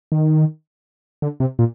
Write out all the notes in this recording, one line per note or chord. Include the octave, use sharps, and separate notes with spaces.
D#3
D3
C3
A#2